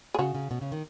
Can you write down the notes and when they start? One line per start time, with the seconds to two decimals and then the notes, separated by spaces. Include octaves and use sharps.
0.14 G#4
0.19 C#3 C#4 F#4
0.35 C#3
0.51 B2
0.61 C#3
0.72 D#3